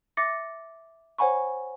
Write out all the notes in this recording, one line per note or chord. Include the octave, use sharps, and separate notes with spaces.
E5 D6 A6 A#6 C#7
C5 C#5 F#5 G#5 B5 C#6